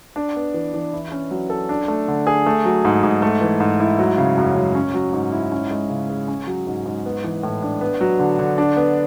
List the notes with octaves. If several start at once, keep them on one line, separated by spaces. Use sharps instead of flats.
D4
B3
E3
E3
E4
C#4
F#3
A4
D4
A3
D3
G#4
A3
F#3
G#2
G#2
A3
E3
G#2
E4
F#3
C#3
F#2
F#2
C#4
F#3
G#2
E4
C#4
G#3
C#3
G#4
C#4
F#3
G#2
G#2
B3
E3
A2
D4
B3
F#3
D3
D3
D4
B3